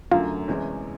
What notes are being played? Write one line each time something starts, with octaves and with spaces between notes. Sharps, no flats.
F#2 D3 F#3 A3 F4
E2 C3 E3 G#3 C#4